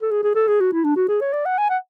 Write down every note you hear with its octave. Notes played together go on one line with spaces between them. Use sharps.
A4
G#4
G#4
A4
G#4
F#4
E4
D4
F#4
G#4
C#5
D5
F#5
G#5
F#5